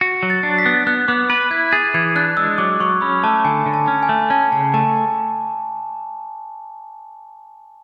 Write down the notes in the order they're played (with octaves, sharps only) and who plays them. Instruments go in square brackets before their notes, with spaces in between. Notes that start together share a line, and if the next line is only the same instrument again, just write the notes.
[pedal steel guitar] F#4
F#3
[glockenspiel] A6
[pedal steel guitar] D4
[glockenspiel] B6
[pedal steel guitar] B3
[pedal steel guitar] B3 [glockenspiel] F#6
[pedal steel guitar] B3 [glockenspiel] D6
[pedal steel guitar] B4 [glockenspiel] F#6
[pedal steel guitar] E4 [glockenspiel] G#6
[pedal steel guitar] G#4 [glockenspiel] A6
[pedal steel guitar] E3 [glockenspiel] G#6
[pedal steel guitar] D4 [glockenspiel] F#6
[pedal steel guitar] G#3 [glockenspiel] E6
[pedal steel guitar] F#3 [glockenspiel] D6
[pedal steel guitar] F#3 [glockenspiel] C#6
[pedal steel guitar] C#4 [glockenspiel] B5
[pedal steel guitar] A3 [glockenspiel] A5
[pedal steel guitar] D3 [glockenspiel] G#5
[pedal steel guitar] D3
[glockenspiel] A5
[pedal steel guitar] C#4
[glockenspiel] G#5
[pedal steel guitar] A3
[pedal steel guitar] C#4 [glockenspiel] A5
[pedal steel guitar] C#3 [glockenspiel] A5
[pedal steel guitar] A3 [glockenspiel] A5